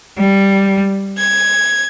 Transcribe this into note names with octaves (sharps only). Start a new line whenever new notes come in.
G3
G#6